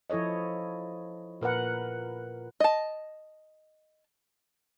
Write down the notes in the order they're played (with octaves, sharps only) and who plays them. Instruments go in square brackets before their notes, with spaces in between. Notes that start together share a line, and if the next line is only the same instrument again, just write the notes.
[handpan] F3 E4 A4 C#5 D#5
A#2 A#4 B4 F#5
[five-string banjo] D#5 A5